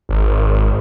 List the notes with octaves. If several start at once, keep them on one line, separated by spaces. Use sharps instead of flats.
G#1